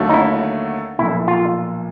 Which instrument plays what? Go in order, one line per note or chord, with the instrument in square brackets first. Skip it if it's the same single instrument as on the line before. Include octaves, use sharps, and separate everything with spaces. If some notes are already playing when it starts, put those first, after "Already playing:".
Already playing: [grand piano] D#2 D3 F#3 A3
[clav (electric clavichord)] D#4
E4
[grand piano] B1 A#2 F3 [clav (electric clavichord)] E4
[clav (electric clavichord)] F4